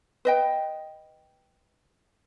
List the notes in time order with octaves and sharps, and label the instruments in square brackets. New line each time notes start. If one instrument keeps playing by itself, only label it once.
[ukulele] B4 D#5 G5